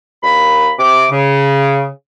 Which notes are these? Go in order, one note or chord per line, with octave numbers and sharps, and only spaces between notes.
D#2 A#3 B5
C3 D6
C#3